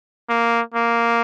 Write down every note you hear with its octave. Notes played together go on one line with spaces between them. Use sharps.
A#3
A#3